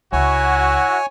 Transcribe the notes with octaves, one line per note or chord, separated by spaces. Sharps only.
C#2 E4 F#4 C#5 G#5